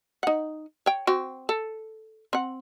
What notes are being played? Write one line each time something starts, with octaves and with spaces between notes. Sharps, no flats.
D#4 F#5
C#5 G5
C4 F#4
A4
C4 F#5